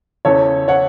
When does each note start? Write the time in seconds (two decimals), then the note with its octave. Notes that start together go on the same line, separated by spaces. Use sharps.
0.25 E2 C#3 E3 C#4 A4 C#5
0.68 C#5 F#5